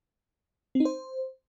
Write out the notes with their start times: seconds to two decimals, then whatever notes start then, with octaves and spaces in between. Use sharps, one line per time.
0.75 C4
0.80 D#4
0.85 C5